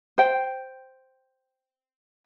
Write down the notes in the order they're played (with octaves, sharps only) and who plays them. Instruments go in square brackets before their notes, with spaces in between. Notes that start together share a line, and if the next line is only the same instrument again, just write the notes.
[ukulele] C5 G5